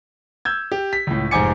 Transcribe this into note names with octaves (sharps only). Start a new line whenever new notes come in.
E6 G6 G#6
G4
B6
C#2 A2
F1 G#2 C5 G#5 D6 C#7